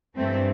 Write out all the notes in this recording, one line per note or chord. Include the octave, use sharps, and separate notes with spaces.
G2 E3 A3 C4